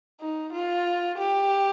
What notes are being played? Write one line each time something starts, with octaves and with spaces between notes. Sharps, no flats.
D#4
F4
G4